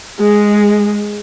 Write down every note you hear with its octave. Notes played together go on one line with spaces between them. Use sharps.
G#3